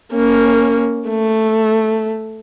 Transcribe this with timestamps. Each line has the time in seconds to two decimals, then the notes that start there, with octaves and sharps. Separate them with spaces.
0.13 A#3 C#4
1.09 A3